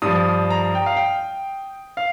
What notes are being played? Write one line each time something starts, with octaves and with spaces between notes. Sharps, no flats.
G2 F3 D#6
A#5
G5
F5
G5
F5